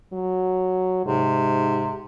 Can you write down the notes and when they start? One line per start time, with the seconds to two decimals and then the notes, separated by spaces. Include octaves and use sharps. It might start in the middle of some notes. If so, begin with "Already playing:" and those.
0.13 F#3
1.06 G#2 C3